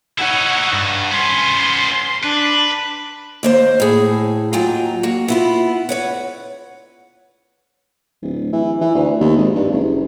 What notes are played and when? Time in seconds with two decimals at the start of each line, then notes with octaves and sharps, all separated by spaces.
0.18 D#4 E4 C#5 F#5
0.73 G2
1.11 B3 C#4 C6
2.24 D4 B4
3.43 D#2 A#3 C5
3.80 A2 G#4
4.53 D#2 F#3 F4 G5 G#5 A#5
5.03 A#3 F#4
5.28 B3 E4 F4
5.89 B4 C#5 F#5
8.22 D1
8.53 E3
8.81 E3
8.95 D2
9.20 D#2
9.37 G#1
9.56 G2
9.72 F#1